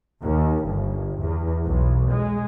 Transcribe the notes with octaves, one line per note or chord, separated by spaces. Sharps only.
D#2
G1
E2
B1
G#3